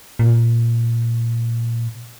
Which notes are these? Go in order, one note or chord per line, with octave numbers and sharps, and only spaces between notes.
A#2